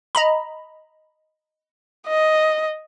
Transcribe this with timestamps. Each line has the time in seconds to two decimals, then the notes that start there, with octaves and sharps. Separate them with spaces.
0.15 D#5 A#5 B5
2.08 D#5